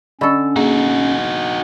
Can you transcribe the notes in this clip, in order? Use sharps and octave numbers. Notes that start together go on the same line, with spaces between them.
D3 C#4 A4 D#5 B5 C#6
A#3 D#4 F#4 G#4